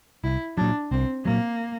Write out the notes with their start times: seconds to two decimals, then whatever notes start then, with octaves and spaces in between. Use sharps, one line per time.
0.24 C2 E4
0.57 A#2 F#3 D4
0.91 C2 C4
1.25 A#2 F#3 A#3